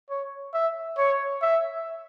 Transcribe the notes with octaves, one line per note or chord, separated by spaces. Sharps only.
C#5
E5
C#5
E5